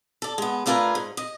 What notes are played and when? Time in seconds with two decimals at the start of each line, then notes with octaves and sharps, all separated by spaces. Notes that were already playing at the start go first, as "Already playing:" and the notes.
0.22 A4 D5
0.38 G#3 B3
0.66 A3 D4 F4 A#4 B4 G#5
0.95 G#2
1.17 D#5